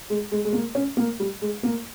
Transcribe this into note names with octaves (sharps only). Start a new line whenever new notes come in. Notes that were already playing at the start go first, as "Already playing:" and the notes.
G#3
G#3
G#3
A#3
C#4
A#3
G3
G#3
A#3